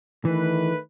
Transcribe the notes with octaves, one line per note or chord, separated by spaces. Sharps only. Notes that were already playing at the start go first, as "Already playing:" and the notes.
D#3 E3 A3 B4